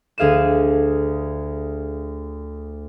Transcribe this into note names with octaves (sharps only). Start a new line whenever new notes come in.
D2 G#4 F5 D#7 E7